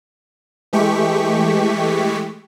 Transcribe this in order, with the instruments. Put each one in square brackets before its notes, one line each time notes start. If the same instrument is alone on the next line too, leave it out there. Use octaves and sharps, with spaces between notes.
[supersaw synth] E3 G#3 A3 G4 C#6 B6